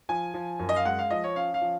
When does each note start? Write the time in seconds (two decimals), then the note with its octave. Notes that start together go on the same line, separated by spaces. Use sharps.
0.09 F3 G#5
0.34 F3
0.59 F#2
0.69 D#5
0.76 F5
0.85 G#3 F#5
0.99 F5
1.10 F3 D#5
1.24 C#5
1.36 C#4 F5
1.54 F5
1.61 F3